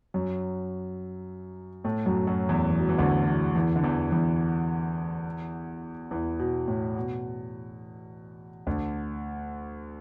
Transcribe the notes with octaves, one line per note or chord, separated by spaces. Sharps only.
F#2 F#3
A2 A3
F#2 F#3
F#2 F#3
E2 E3
E3
F#3
E2 E3
D2 D3
E2 E3
E2 E3
D3
E2 E3
E2 E3
E2 E3
B2
A2
B2
D2 D3